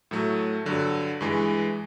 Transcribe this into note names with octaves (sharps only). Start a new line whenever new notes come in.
A2 F#3 A3
G2 D3 F#3
G2 E3 G#3